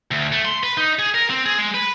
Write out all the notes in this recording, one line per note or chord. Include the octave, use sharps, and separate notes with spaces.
D2
A3
C6
B4
D#4
G#4
A#4
C4
G#4
G#3
B4